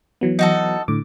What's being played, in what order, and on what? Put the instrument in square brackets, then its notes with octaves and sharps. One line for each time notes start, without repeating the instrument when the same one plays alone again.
[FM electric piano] E3 F#3 B3
[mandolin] D#4 F#4 A4
[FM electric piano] A2 D3 D6